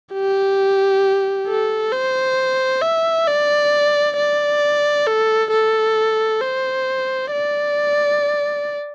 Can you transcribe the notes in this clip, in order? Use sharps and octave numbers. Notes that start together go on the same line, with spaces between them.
G4
A4
C5
E5
D5
D5
A4
A4
C5
D5